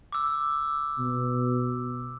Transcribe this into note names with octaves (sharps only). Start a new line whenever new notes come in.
D6 E6
B2